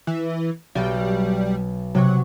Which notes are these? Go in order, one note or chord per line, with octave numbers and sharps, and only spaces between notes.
E3
B1 G3
C3 F#3 C#6